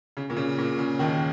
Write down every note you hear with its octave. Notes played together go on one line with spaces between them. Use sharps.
C#3
A#2
C#3
A#2
C#3
D#2 D#3